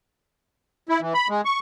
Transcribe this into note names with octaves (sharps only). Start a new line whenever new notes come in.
E4
E3
B5
G#3
C#6